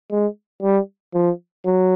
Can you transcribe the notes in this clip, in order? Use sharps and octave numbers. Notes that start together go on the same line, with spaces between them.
G#3
G3
F3
F#3